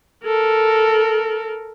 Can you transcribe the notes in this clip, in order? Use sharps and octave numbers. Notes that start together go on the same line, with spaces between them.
A4 A#4